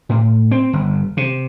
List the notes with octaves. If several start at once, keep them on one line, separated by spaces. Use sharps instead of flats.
A2
C4
G1
C3